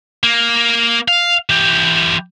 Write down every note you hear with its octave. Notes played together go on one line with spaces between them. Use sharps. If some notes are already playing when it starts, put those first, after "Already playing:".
A#3
F5
E3 G4